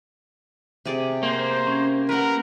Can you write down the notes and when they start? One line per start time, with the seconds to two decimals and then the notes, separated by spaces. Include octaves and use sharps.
0.85 C3 G#4 D5
1.23 A#3 C5
1.67 C#4 G#6
2.09 A#4 B4 F#5